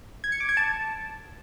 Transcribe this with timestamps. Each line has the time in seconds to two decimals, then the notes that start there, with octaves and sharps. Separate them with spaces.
0.24 G#6
0.32 C#7
0.40 D6
0.49 G#6
0.57 A5